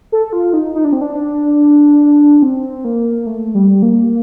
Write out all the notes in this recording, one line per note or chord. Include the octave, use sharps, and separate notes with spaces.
A4
F4
D#4
D#4
D4
C4
D4
C4
A#3
A3
G3
A#3